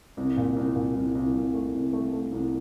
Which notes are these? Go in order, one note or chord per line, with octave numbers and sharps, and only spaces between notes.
C2
A#2
C2
A#2
C2
C2
C2
A3
C2
A3
A3
C2